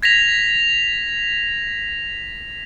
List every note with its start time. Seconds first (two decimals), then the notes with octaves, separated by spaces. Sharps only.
0.03 G#6 A#6 B6 F7